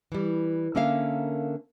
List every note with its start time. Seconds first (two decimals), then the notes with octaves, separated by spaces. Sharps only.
0.12 E3 G3
0.75 D3 A#3 C#4 A#4 E5 F5